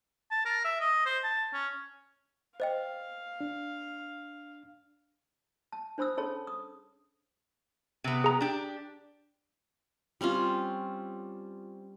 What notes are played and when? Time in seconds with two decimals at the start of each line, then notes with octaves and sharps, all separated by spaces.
0.31 A5
0.45 A#4
0.65 E5
0.80 D#5
1.06 C5
1.24 A5
1.53 C#4
2.60 C5 D#5 F5 G5
3.41 D4
5.72 A5
5.98 D4 C5 B5 D#6 E6
6.17 C#4 G#4 A4 C#5 A5 B5
6.47 D#6
8.04 C3 B3
8.24 G#4 A#5
8.41 D4 G4
10.21 G3 C4 C#4 F4